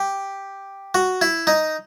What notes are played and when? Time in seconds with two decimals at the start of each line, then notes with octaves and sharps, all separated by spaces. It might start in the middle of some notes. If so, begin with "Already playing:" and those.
Already playing: G4
0.95 F#4
1.21 E4
1.47 D#4